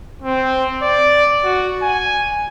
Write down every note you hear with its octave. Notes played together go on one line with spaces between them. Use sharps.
C4
D5
F#4
G#5